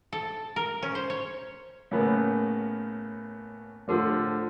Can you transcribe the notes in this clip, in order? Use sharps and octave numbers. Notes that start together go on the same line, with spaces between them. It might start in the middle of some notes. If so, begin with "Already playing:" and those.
A4
A#4
C#4
C5
C#5
A2 C#3 A#3 B3
A2 D3 F3